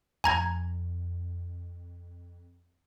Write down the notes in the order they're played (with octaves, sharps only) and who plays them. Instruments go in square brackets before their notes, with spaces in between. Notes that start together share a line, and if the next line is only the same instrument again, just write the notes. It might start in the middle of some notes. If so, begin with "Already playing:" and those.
[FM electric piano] F2 [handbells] G#5 A#5 G#6